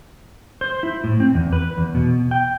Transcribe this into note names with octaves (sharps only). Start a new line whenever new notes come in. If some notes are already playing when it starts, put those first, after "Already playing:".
C5
E4
A2
C4
E2
B4
E2
B2
G5